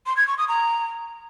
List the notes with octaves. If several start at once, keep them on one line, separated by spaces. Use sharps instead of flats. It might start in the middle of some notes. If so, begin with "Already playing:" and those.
C6
G#6
C#6
D#6
A#5